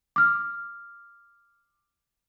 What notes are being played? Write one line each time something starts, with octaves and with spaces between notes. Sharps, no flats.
D6 F6